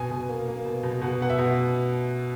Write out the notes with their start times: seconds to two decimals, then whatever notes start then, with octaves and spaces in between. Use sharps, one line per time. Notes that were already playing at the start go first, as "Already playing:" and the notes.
Already playing: B2 G#5
0.11 B2
0.29 A#3
0.48 A#3
0.65 B2
0.83 B2
1.01 B2 F#5
1.21 B3 F#5
1.30 E5
1.39 B2